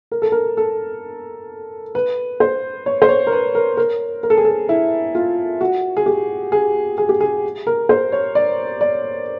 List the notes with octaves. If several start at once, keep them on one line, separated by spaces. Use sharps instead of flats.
A#4
A4
A#4
A4
B4
C5
C#5
C5
C#5
A#4
B4
A#4
A#4
A#4
A4
G#4
A4
E4
F4
F#4
G#4
G4
G#4
G#4
G4
G#4
A#4
C5
C#5
D5
D5